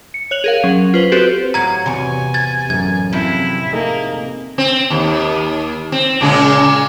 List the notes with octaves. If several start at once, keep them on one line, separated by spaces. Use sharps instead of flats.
C#7
C#5 F#6 F7 F#7
G#4 A#4 F5
F#3 C#4
F4 B4 C5
C4 F#4 G4 A4 B4 C5
A2 F#3 F5 A#5 G#6
E2 C3 F#4 C#5 G#5
G#6 A6
A1 F#2 G#6
C3 F3 E4 C5
A3 A#3 D#4 G#4
C4
D#2
C4
A#2 C#3 G#3